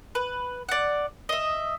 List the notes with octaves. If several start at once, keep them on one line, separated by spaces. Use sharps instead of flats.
B4
D5 F#5
D#5 E5